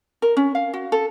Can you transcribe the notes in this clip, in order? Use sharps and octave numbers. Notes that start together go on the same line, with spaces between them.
A#4
C#4
F5
F#4
A4